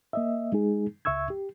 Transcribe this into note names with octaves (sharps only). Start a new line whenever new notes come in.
A#3 D#5 E5
G#3 D#4 G#4
C#2 E5 C#6 E6 G#6
G4